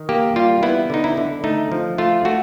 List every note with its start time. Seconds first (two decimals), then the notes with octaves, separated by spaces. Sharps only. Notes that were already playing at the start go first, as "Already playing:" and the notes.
Already playing: D#3
0.09 A#3 G4
0.36 G3 F4
0.63 B3 E4
0.90 D3 D#4
1.04 E4
1.17 D3
1.44 A3 D#4
1.72 F3
1.98 A3 F4
2.25 A3 F#4